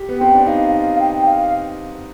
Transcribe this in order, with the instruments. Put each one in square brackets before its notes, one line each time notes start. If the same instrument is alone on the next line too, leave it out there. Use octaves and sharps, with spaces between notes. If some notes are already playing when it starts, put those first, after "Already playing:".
Already playing: [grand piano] G4
B3
[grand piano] C4 [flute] G5
[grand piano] D4
[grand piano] D#4 [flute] F5
[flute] F5
G5
F5